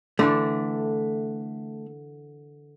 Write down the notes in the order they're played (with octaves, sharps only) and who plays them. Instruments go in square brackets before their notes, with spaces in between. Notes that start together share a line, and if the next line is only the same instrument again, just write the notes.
[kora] D3 E3 D4 [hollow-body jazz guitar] A3